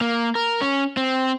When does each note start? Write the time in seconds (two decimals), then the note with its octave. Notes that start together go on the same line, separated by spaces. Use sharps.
0.01 A#3
0.35 A#4
0.61 C#4
0.97 C4